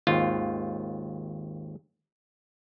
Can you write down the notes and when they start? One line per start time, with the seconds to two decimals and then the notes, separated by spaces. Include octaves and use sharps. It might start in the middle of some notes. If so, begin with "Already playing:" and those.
0.07 G#1 D#2 F4